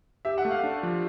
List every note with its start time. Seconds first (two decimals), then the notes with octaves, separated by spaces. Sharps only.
0.25 G4 E5
0.38 F#5
0.45 A3
0.51 F5
0.63 D4
0.83 F3